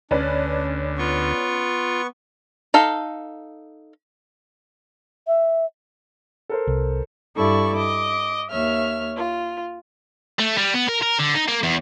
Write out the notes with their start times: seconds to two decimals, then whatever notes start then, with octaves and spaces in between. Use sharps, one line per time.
0.11 D2 C#4 D4 B4 D5
0.98 B3 F4 C#6
2.74 D#4 A4 F5
5.27 E5
6.50 A4 A#4 C5
6.67 C2
7.36 G2 E4 A4 D5 C#6
7.77 D#5 D6
8.51 D#2 C#5 E5 F6
9.16 F4
10.39 A3
10.57 G3
10.74 B3
10.88 A#4
11.02 A#4
11.19 D3
11.34 D#4
11.48 A#3
11.63 E2